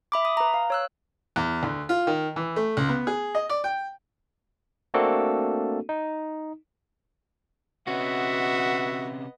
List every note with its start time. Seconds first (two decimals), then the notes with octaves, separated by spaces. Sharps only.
0.12 E5 B5 D6
0.25 D#6
0.37 B4 A#5
0.54 F5
0.70 C#5 E6 F#6
1.36 E2
1.63 D2
1.89 F4
2.07 D#3
2.36 E3
2.56 A3
2.77 C#2
2.89 B3
3.07 G#4
3.35 D#5
3.49 D5
3.64 G5
4.94 A3 A#3 C4 D4 F#4 A4
5.89 D#4
7.87 C3 B3 C#4 F#4 D#5 E5